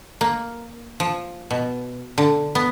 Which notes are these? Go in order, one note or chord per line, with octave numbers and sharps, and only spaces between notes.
A#3
F3
B2
D3
B3